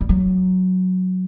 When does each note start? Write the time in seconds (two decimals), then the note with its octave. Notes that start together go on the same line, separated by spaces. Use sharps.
0.01 G3
0.09 F#3